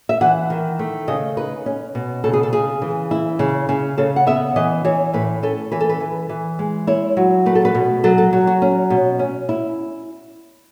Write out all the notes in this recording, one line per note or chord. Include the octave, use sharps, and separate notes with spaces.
E5
E3 F#5
D#3
A3
C#3 D#5
D#4 B4
C#4
B2
C#3 A4
G#4
A4
C#3 G#4
E3
E4
C#3
C#3
C#3 A4
F#5
B3 E5
E3 D#5
E3 C#5
A2 B4
C#4 A4
E3 B4
A4
B4
E3
E3
G#3
E4 C#5
F#3
A3 B4
A4
B4
B2
F#3 A4
A4
F#3
F#4
C#4
B2
C#4
E4